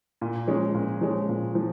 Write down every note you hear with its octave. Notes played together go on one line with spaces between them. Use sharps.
A#2
F3 G#3 C#4
A#2
F3 G#3 C#4
A#2
F3